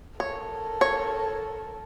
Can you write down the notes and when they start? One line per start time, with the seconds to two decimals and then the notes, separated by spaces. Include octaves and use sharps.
0.20 A4 A#4 C#5
0.81 C#5